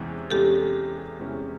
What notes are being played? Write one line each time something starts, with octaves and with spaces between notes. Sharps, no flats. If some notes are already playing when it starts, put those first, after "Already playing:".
Already playing: E2 C3 E3 G#3 C#4
E2 C3 E3 G#3 C#4 G4 A4
E2 C3 E3 G#3 C#4